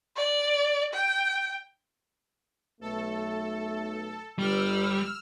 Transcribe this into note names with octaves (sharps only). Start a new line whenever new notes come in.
D5
G5
B1 A3 A4
G1 G3 E6 F6